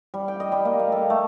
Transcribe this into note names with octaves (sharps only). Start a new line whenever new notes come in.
G3
G5
D#5
G3
A#3
F5
A4
A3